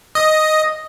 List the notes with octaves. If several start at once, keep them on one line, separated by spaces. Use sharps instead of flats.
D#5